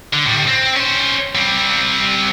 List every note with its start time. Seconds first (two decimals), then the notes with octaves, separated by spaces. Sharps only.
0.13 D3
0.25 A2 G3
0.47 C4
0.76 C#4 C5
1.35 G3 C4